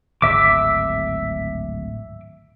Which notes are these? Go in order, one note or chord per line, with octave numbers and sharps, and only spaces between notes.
D1 G#1 E5 D6